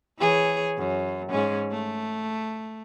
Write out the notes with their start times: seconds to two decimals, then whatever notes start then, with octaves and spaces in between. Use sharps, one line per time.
0.19 E3 G#4 C#5
0.77 F#2
1.30 G#2 G#3 C#4
1.71 A3